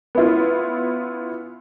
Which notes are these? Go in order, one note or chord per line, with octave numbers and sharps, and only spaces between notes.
B3 C#4 E4 F4